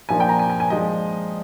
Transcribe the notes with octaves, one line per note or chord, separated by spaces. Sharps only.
A#2 F3 A#3 D4 G#5
G5
A#5
G#5
G#5
G#5
F3 G#3 D4 D#5